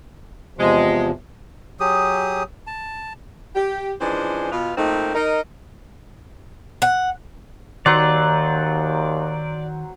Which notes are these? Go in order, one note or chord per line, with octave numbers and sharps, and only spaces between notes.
E2 C3 F3 G#3
F#3 G4 G#4 D#6
A5
G4
E3 F3 G#3 C#4 D4 C5
B2 F4
A#2 A3 A#3 C4 D#4
D#4 A#4 D#5
F#5
D#2 D#3 F#3 C5 D5 F#5 A#5